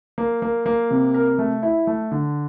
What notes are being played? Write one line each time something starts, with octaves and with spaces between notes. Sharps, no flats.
A#3
A#3
A#3
C3
A#4
A3
E4
A3
D3